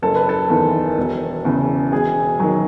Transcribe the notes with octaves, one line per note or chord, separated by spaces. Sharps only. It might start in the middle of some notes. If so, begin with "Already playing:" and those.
F#1 A4
B4
A4
E2 D#3
E1
E2 C#3
E1 G#4
D#3 F#3